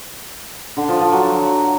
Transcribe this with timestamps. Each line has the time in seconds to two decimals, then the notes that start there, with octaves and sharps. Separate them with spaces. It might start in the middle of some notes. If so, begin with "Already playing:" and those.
0.77 D3
0.89 F3
1.00 F3
1.12 F#3